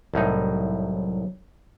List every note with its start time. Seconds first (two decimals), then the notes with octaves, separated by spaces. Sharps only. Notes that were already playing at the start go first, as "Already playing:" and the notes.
0.14 C2 A2 F#3 D#4